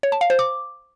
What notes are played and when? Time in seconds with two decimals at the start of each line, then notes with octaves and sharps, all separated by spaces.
0.03 C#5
0.12 A5
0.21 F5
0.30 C5
0.39 D6